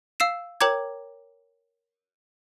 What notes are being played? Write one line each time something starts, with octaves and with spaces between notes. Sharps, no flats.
F5 E6 C7 E7
A#4 C#5 G5 A#5 D6 G#6